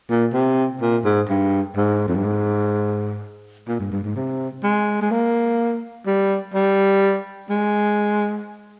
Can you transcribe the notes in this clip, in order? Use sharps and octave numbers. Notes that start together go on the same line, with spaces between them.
A#2
C3
A#2
G#2
G2
G#2
F2
G2
G#2
A#2
G2
G2
G#2
C3
G#3
G#3
A#3
G3
G3
G#3